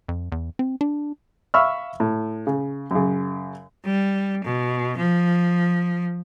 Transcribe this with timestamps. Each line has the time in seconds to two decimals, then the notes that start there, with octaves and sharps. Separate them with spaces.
0.08 F2
0.32 E2
0.59 C4
0.81 D4
1.54 E5 F5 B5 C#6 E6 F6
2.00 A2
2.47 C#3
2.91 F#2 C#3
3.85 G3
4.44 B2
4.97 F3